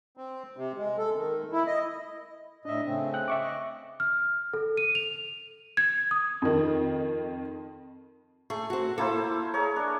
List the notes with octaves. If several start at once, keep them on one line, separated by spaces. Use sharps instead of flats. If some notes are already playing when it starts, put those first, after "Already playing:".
C4
C3
G#3
A4
D#3
E4
D#5
A2 D4 D#5 E5
C#3 A3 C4
G5 F#6
E5 C#6 D6
D#5
F6
A4
D#7
F7
G#6
D#6
F2 D#3
A3 G#4
C4 F#4
A#3 E4 A4 C5
G#4 A#4 C#5
D4